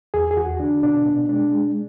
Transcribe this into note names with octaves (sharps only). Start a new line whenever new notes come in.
E2 G#4
G#4
E2 F#4
D3 D4
B2 D4
B2
G#3 D4
G#3